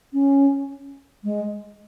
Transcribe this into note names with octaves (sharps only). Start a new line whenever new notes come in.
C#4
G#3